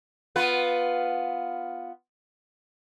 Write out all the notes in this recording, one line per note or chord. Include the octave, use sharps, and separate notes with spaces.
B3 F4 B4